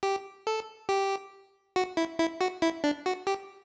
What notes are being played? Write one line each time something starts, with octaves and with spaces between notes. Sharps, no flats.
G4
A4
G4
F#4
E4
E4
F#4
E4
D4
F#4
G4